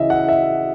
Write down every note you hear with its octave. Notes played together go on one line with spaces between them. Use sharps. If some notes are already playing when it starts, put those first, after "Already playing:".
Already playing: C#3 E3 D#5 E5
F#5
E5